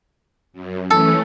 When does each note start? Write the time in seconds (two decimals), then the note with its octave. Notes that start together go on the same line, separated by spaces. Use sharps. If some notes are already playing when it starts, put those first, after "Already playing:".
0.53 F#2
0.90 E3 A3 C#4 A4